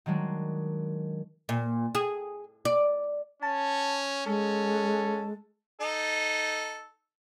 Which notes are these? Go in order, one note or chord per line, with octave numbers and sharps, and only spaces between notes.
D#3 F#3 G#3 D4
A#2
G#4
D5
C#4 A5
G#3 C#4 A4
D#4 A4